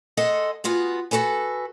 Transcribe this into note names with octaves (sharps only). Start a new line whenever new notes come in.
G#4 A4 C5 D#5 F#5
B3 F4 F#4 G#4
F#4 G4 A4 B4 G#5